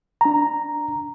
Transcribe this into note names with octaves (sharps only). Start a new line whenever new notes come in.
D4 A#5